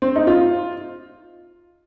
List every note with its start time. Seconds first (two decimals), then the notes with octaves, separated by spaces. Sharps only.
0.02 C4
0.16 D#4
0.27 F4